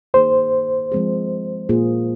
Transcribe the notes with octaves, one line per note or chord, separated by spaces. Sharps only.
D#3 A#3 D#4 G#4 C5
F3 G#3 C4 G#4
A#2 A#3 F4 G#4